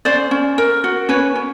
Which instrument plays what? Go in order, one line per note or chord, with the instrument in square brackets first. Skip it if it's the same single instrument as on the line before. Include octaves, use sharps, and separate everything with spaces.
[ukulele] C#4 C5 D5
C#4
A#4
F#4
C#4 B4 C#5
C#4